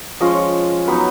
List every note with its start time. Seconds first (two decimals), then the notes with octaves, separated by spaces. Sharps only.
0.20 F3 G#3 C#4 F4 D#5
0.32 C#5
0.87 F#3 B3 D#4 B4